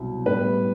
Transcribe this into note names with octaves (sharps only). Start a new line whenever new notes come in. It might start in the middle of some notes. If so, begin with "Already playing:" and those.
Already playing: C2 B2 F#3 C4
A2 G3 B3 B4